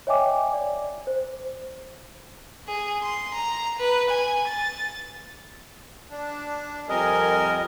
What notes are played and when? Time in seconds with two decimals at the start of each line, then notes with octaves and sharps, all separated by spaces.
0.07 C#5 D#5 E5 G5 G#5 D6
0.53 D5
1.07 C5
2.68 G#4
3.02 C6
3.34 A#5
3.78 B4
4.10 G#5
4.48 A6
6.10 D4
6.89 F2 G3 C4 A#4 D#5 G#5